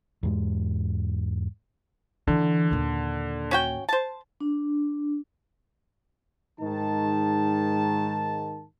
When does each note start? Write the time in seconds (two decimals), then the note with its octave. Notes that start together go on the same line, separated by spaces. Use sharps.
0.23 E2 G#2 G#3
2.27 D3 E3
2.71 D#2 A#2
3.51 C#4 F#4 G5
3.89 C5 A5
4.41 D4
6.60 G#2 D#3 D#4 A5